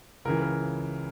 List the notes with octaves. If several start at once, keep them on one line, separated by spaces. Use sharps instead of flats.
C#2 C#3 E3 A#4
A#4